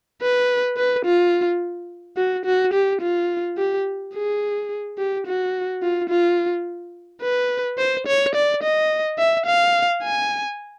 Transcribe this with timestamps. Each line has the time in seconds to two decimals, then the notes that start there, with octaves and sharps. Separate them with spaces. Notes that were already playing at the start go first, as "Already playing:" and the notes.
0.22 B4
0.77 B4
1.06 F4
2.17 F#4
2.45 F#4
2.73 G4
3.02 F4
3.58 G4
4.15 G#4
4.98 G4
5.27 F#4
5.82 F4
6.10 F4
7.22 B4
7.78 C5
8.07 C#5
8.35 D5
8.63 D#5
9.18 E5
9.46 F5
10.03 G#5